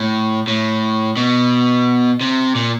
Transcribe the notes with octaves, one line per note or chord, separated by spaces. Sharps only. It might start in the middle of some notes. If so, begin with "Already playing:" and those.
Already playing: A2
A2
B2
C3
A#2